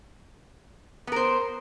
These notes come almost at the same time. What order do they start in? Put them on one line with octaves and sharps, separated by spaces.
B3 A#4 C5